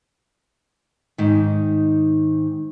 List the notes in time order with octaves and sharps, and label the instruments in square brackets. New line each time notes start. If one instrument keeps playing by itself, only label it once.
[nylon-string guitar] G#2 D#3